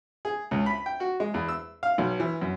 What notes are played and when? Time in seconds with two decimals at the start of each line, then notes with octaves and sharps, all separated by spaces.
0.25 G#4
0.51 C#2
0.66 B5
0.86 G5
1.00 F#4
1.20 G#3
1.34 E2
1.49 E6
1.83 F5
1.98 B1
2.20 E3
2.41 F#2